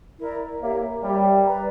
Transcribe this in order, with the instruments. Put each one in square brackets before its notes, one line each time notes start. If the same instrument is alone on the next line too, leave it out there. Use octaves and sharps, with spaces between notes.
[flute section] E4 A#4 D5
[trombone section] A#3 [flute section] G4 A#4 C#5 E5
[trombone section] G3 [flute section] G4 A#4 C#5 E5
[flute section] B4 D5 A#5